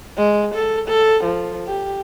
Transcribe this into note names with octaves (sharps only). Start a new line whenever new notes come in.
G#3
A4
A4
F3
G4